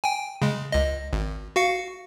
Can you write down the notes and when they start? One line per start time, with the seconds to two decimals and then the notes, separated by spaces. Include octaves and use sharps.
0.04 G5 G#5
0.42 C#3 G#3
0.72 C#2 D#5
1.13 G#1
1.56 F#4 F5 C#7